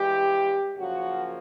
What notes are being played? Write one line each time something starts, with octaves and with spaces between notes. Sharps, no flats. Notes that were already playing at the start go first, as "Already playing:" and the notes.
Already playing: G2 E3 G#3 G4
F#2 C#3 F3 A#3 C#4 F#4